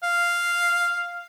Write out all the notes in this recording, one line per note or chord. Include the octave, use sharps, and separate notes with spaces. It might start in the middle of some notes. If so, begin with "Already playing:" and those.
F5